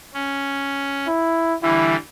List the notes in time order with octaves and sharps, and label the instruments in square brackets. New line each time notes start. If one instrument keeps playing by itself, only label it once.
[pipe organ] C#4
[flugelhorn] E4
[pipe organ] D3 E3 G3 [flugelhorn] E4